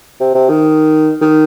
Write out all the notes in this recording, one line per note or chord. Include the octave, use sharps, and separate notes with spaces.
C3
C3
D#3
D#3